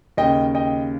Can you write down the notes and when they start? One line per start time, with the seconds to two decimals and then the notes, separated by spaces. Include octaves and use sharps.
0.17 D#2 C#3 D#5 G5
0.55 D#5 G5